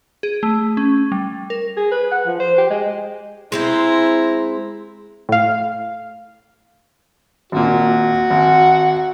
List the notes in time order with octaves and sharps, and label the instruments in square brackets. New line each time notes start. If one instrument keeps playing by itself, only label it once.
[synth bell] G#4
A3
C#4
G3
A#4
[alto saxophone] G#4
B4
F#5
F3
C5
G4
G#3
[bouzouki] G#3 C4 C5 [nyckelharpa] E4 A#5
[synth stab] A2 F5
[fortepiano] G#1 A#2 [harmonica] F#4
[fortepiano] G#1 [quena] F#5